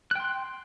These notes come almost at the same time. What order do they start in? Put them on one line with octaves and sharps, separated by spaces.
F#6 G5 C6